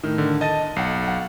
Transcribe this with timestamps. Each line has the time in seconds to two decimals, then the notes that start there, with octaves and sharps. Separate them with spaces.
0.03 A2 D#3
0.18 D3
0.41 D#5 A5 A6 D#7
0.76 B1 F#5 C7
1.03 F5 F#5